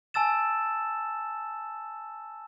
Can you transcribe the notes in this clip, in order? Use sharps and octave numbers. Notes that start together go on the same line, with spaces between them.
G#5 A5 E6 A6 E7